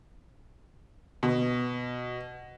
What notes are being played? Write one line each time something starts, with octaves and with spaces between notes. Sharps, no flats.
B2